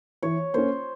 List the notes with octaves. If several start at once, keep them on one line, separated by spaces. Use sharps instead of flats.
E3 C#5
A#3 C#4 C5